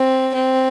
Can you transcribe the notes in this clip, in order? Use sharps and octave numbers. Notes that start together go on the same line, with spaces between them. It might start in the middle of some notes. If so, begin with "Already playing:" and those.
Already playing: C4
C4